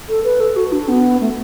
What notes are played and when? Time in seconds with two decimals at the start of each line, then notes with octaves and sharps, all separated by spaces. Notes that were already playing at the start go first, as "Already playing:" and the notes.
0.09 A4
0.24 B4
0.40 A4
0.56 F#4
0.72 D4
0.88 B3
1.21 A3